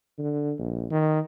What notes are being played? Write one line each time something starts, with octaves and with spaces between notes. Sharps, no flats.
D3
A#1
D#3